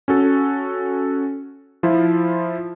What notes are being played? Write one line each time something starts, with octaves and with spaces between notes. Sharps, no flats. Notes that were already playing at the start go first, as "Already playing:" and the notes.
C#4 F#4 A4
F3 E4 F4